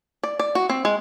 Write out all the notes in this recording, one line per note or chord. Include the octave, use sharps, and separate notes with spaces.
D5
D5
F#4
C4
G#3